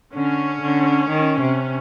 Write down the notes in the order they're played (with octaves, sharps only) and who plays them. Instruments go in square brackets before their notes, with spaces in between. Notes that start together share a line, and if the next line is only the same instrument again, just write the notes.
[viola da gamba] D3 [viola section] C#4
[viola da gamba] D3
D#3
C3